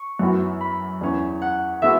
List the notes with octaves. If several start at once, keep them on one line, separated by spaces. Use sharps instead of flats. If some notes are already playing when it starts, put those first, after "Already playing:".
Already playing: C#6
F#2 E3 B3 F#4
B5
E2 E3 C#4
F#5
E3 G#3 B3 F#4 E5